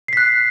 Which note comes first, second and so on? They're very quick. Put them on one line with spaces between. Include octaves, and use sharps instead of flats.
C7 B6 F#6